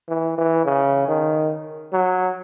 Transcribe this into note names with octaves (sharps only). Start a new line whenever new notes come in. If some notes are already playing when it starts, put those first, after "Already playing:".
E3
E3
C#3
D#3
F#3